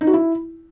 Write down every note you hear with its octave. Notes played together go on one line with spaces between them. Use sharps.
D#4
F#4
E4